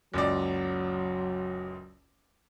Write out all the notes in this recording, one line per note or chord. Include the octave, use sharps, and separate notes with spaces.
F#1 C#2 F#3 D5